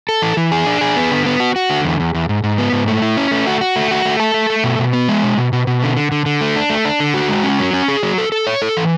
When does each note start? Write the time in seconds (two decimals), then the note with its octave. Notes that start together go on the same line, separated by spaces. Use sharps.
0.09 A4
0.22 E3
0.37 E3
0.52 G#4
0.67 D4
0.81 G#4
0.96 B3
1.11 D3
1.26 B3
1.40 F#4
1.56 F#4
1.70 D3
1.85 E2
2.00 E2
2.14 E2
2.29 G#2
2.43 G#2
2.58 B3
2.73 G#2
2.88 A3
3.02 E4
3.17 C#4
3.31 A3
3.47 F#4
3.61 F#4
3.76 A3
3.91 F#4
4.05 A3
4.20 A4
4.34 A3
4.50 A3
4.64 B2
4.79 B2
4.93 B3
5.09 G#3
5.23 B2
5.37 B2
5.53 B2
5.67 B2
5.83 D3
5.97 D3
6.12 D3
6.26 D3
6.41 A3
6.56 D4
6.70 A3
6.85 D4
7.00 D3
7.14 F#4
7.29 G#3
7.44 C#4
7.59 F#3
7.73 C#4
7.88 G#4
8.03 F#3
8.18 A4
8.32 A4
8.47 C#5
8.62 A4
8.77 E3